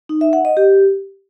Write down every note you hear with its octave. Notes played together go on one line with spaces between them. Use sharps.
D#4
E5
F#5
D#5
G4